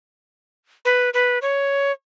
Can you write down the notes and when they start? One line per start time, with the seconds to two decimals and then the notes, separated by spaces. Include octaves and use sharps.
0.85 B4
1.14 B4
1.42 C#5